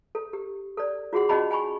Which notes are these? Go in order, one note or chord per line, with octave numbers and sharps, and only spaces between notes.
A4
G4
A4 D5
F4 F#4 G#4 F#5 C6
C#4 F#4 D#5 G5 A5 B5
G5 G#5 B5 C#6